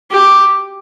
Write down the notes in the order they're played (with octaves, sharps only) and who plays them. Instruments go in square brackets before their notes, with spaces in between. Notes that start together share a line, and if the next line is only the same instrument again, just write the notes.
[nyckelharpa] G4